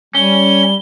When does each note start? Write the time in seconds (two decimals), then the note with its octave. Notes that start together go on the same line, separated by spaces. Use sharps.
0.15 G3 C#4 G7